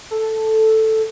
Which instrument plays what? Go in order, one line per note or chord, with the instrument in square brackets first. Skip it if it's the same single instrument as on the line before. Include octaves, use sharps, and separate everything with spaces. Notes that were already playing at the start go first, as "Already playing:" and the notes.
[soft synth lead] A4